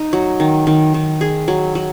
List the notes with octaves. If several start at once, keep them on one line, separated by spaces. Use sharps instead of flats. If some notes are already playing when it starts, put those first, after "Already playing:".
Already playing: D#4
F#3
D#3
D#3
D#3
G#4
F#3
F#3